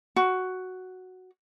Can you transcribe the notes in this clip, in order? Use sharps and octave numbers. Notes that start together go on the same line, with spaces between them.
F#4